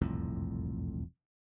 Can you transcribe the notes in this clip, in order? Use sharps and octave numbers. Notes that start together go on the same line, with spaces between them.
E1 C2 F2 A2